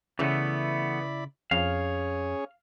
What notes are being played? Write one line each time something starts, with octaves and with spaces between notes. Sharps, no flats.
C#3 E3 A3 B3 E4 D5 B5
F2 C#4 G#4 C#5 F5